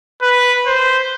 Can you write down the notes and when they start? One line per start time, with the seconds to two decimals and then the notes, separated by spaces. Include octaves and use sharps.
0.22 B4
0.66 C5